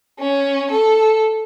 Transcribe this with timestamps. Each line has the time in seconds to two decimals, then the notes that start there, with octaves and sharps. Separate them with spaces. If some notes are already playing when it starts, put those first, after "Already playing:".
0.19 C#4
0.71 A4